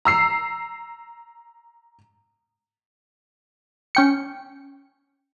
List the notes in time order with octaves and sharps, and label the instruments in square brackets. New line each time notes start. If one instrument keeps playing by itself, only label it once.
[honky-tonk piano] A#5 E6 C7
[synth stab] C#4 G5 C#7